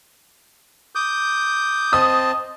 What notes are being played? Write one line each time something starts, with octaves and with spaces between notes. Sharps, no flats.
D6 D#6 G6
C4 D#5 A5 D#6